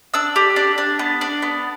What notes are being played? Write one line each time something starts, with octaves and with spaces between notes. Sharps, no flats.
D4 E6
G4
D4
D4
B3
D4
B3